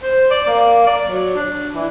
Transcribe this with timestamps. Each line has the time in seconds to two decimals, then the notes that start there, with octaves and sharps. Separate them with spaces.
0.02 C5
0.30 D5
0.47 A#3
0.87 D5
1.06 F#3
1.35 D4
1.73 E3